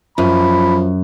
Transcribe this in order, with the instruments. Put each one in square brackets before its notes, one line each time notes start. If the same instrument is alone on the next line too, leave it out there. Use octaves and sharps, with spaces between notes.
[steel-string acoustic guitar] F#2 [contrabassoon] F3 [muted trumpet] B5